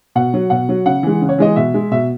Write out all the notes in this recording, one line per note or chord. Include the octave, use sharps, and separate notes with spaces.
B2 F#5
F#3
B2 F#5
F#3
C#3 F#5
E3 G#3
C#3
C#5
E3 G#3 D#5
B2 E5
G#3
B2 E5